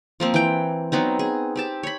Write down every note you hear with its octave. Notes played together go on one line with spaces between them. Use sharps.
F3 A#3 C4
E3 G5
F#3 B3 C4 D#4
G#4
C4 G4 A5
C#5 B5